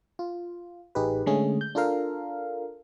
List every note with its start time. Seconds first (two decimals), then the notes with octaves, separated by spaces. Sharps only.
0.19 F4
0.95 A1 D#4 G4 G#4 B4
1.26 D3 G#3 A3 C#4 G#4
1.61 G6
1.75 D4 F4 A4 A#4 F5